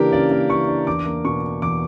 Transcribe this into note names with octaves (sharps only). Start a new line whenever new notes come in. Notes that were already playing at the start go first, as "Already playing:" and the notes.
Already playing: C#3 E3 A#3 D4 G4 A#4
C#3 D5
A#3
E3 C#6
D4
E2 D6
A#3
B2 C#6
D4
E2 D6